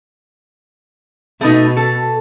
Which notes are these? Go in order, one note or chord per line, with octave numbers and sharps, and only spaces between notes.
B2 A3 B3 D#4
A4